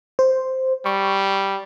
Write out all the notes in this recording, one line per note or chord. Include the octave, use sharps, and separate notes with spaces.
C5
G3 C#6